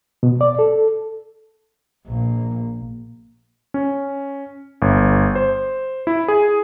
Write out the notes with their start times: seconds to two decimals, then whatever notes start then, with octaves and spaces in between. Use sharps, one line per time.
0.23 B2
0.41 D5
0.59 A4
2.07 A#1 A#3
3.74 C#4
4.82 G1
5.36 C5
6.07 E4
6.28 G#4